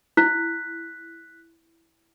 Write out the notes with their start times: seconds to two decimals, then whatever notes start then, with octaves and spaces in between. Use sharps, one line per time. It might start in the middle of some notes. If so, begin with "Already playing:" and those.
0.17 E4 F#6 B6